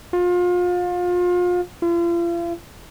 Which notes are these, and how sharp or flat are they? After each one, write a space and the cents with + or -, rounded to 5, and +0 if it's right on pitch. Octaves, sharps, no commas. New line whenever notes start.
F4 +30
F4 -40